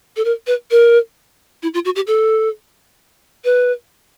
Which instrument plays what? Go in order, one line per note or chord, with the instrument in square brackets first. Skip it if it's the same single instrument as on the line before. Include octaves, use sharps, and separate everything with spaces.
[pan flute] A4
A#4
B4
A#4
E4
F4
F#4
G4
A4
B4